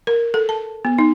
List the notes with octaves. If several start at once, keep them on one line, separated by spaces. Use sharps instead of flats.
A#4
A4
A5
B3
D#4